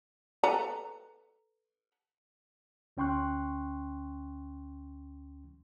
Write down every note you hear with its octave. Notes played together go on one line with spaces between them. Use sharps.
A4 B4 A#5
D2 C#4 G5 C6 C#6 F#6